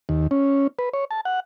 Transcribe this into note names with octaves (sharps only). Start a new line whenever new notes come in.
D#2
C#4
B4
C#5
A5
F#5